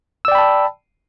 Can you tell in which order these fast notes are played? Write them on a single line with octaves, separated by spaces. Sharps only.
E6 D5 G5 B5 A5